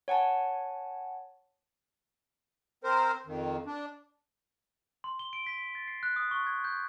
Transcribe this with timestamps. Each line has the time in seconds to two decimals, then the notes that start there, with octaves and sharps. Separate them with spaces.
0.08 C#5 F#5 G#5 A5
2.84 C4 A#4 C5
3.26 F2 D#3
3.66 D4
5.04 C6
5.19 G7
5.33 D7
5.46 B6
5.75 A6
5.88 C7
6.03 F#6
6.16 D#6
6.31 C#6
6.47 G#6
6.64 G6